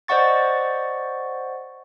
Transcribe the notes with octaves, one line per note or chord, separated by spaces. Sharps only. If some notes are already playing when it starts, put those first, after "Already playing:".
C5 D5 D#5 F#5 C#6 A6